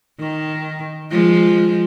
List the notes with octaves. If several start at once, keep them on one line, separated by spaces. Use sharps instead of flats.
D#3
F3 G#3